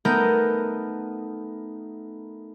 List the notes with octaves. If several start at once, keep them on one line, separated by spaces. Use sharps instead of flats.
A3 B3 D#4 A#4 G6